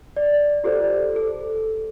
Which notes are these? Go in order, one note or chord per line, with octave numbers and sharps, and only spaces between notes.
D5
F4 G4 A4 C5 D5
A4